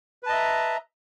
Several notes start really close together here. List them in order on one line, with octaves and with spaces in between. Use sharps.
B4 A5 D#5 E5 A#5